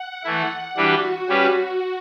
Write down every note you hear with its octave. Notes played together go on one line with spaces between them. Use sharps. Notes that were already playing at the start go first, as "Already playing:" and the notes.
Already playing: F#5
E3 A3 E4
E3 G3 D4 F#4 G4 B4
G3 C#4 G4 B4